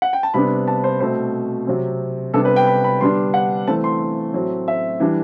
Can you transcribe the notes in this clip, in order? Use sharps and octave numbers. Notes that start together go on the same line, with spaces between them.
F#5
G5
A5
C3 G3 B3 D4 B5
A5
C5
B2 A3 C4 C5
C3 F#3 C4
C3 G3 B3 D4 A4
B4
G5
B5
B5
D3 G3 B3 D4 C6
F#5
E3 A3 C4 A5
C6
A2 F#3 A3 C4
E5
E3 G3 D4